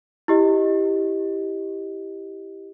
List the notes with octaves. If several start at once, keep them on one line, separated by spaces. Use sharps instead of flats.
E4 G4 D#5